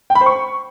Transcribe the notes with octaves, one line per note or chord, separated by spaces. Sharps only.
G5
B5
C5
C#6